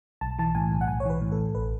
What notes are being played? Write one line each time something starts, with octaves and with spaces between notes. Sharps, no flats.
B1 A5
E3 A5
A2 G#5
B1
F#5
B1 G#5
C#5
E3 B4
A2
A4
B1
A1 B4